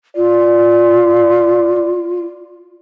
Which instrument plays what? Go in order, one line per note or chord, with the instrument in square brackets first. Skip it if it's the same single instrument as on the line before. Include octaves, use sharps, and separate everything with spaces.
[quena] F4 [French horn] D5